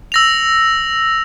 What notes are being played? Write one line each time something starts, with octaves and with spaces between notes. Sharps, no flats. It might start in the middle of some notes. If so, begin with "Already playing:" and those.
E6 A#6 F7